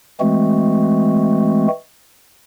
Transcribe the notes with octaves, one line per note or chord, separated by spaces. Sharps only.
E3 G#3 A3 C4 F#4